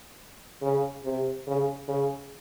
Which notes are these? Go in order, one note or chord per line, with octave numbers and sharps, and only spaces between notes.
C#3
C3
C#3
C#3